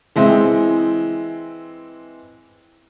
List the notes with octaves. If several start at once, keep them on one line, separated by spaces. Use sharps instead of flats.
E3 G#3 C4 E4